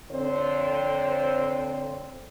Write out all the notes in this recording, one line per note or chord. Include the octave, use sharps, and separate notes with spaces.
F2 D3 C4 C5 C#5